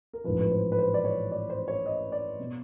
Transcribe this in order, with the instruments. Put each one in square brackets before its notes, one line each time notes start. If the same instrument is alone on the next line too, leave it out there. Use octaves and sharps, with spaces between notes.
[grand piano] A#4
A1 G#2 F3 B4
B4
C5
B4
C5
D5
C#5
D5
C5
C#5
D#5
D5
B2